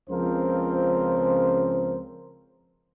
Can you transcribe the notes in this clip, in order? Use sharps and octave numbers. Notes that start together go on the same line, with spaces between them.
C#2 C#3 F3 C4 A#4 C5